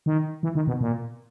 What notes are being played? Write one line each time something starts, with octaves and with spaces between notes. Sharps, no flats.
D#3
E3
D#3
B2
A#2